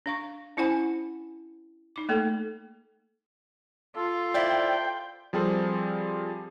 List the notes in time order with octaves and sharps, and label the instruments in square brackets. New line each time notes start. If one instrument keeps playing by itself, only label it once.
[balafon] D4 F5 C#6
C#4 E4 C5 F#5 G#5 B5
D#4 D6
A3 A#3 A4
[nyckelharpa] F4 [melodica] A4
[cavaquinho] E4 C5 D5 [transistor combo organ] G5
[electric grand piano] F3 G3 C4 G#4 A4 C5